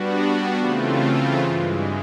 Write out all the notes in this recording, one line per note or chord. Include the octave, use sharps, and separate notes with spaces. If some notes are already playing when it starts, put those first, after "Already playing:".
Already playing: G3 B3 D4 F#4
C#3 E3 A3 C4 F4
G2 E3 G#3